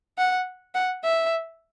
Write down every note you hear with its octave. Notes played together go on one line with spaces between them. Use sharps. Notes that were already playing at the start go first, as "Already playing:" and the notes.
F#5
F#5
E5